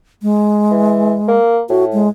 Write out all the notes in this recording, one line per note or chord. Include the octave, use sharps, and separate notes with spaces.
G#3
E3
A#3
A2 F#4
G#3